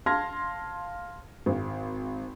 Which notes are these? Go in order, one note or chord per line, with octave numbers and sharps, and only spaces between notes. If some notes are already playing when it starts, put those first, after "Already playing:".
F5 A5 C6 F6 G#6 A#6
G#1